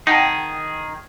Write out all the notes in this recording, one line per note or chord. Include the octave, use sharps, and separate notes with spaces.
D#3 D#4 G#4 F#5 G5 A5